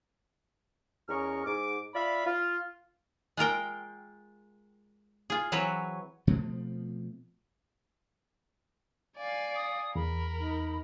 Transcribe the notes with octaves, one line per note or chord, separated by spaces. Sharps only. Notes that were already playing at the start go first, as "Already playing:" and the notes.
E2 C#4 A#4 D#5 C#6 F6
G#2 D6
F4 D5 E5 F5 B5
F4
G#3 F4 A#4 G5
F4 G#4
E3 F#3 C4 F#4 B4 C#5
B2 F3 A3 C4
D5 F5 G#5
D#6
E2 A#4 B5
D#4